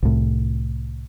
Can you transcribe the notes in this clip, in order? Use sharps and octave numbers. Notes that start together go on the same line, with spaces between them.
C2 A2